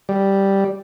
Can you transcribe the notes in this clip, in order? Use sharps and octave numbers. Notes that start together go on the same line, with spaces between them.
G3